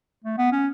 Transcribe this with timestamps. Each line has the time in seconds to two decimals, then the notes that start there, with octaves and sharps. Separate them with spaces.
0.24 A3
0.38 B3
0.52 C#4